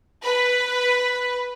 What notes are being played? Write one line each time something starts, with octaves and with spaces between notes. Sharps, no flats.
B4